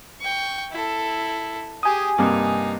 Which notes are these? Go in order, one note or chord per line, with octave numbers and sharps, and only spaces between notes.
G5 C#6
E4 A4
G4 G#4 G#5 D#6
G2 C3 A#3 D#4